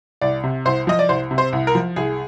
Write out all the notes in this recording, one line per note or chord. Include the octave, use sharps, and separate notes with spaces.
C2 D5
C3
C2 C5
F3 D#5
D5
C2 C5
C3
C5
C2
A#4
F3
C2 G#4